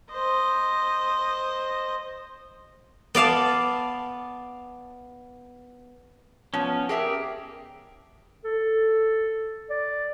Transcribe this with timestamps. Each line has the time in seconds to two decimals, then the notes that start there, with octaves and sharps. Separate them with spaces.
0.12 C5 D#5
3.15 B3 D5 F5 A5
6.54 F3 B3 C#4
6.89 G4 G#4 A#4 E5
8.44 A4
9.70 D5